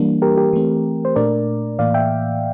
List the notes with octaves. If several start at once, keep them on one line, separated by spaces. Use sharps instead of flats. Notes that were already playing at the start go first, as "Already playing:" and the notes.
Already playing: E3 G3 A#3 D4
G4 A#4
G4 A#4
E3 A3 C4
C5
A#2 A3 D4 A#4 D5
A2 E3 A#3 D5 F5
E5 G5